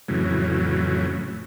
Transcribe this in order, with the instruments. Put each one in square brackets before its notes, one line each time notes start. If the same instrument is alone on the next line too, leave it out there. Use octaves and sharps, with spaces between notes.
[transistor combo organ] F2 A2 C#3 E3 F#3